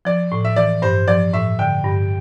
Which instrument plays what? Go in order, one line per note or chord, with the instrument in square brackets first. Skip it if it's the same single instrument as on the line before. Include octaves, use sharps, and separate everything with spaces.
[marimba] F3 [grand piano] D5
[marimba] A2
[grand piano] E5
[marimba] E3 [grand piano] D5
[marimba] G2 [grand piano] C5
[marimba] F3 [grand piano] D5
[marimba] A2 [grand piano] E5
[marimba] D3 [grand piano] G5
[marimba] G2